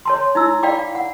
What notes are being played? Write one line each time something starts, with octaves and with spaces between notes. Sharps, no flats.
C#5 A5 C6
D#4 E4 E6
D5 F5 G5 B5 D6
F5
F#5